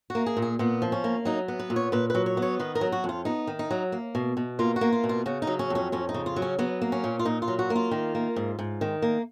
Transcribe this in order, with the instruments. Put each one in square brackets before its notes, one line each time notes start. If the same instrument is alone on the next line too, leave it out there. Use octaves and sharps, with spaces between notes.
[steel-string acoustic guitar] A#3 F#4
G#4
A#2
G#4
A#2 B3
F3
C#4
A#3
F#3 D#4
B3
B4
A#2
C#5
A#2 B4
F#3 B4
C#5
B3
C#5
D#3 B4
A#4
F#3
F#4
F2
F4
B3 D#4
D#3
D#4
F#3
A#3
B2
B2
A#3 F4
F#4
A#3
F4
B2
F4
C#3 F#4
D#4
F#3
C#4
F2 C#4
F2 C#4
D#4
C#3
F4
F#3
C#4
F#3 B3
A#3
C#4
A#2
F4
A#2 D#4
F4
F#3
F#4
A#3
F4
D#3
A#3
G#2
G#2
D#3
A#3